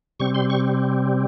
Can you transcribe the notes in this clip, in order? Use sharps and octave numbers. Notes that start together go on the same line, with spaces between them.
C3 G3 C4 C#6
C6
C#6